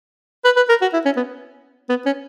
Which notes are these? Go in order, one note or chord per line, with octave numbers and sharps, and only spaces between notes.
B4
B4
A#4
F#4
E4
C#4
B3
B3
C#4